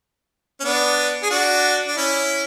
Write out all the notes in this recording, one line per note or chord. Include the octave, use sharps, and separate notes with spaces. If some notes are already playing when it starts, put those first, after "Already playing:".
C#4
B3 D4
G#4
D4 F#4
D4
C#4 E4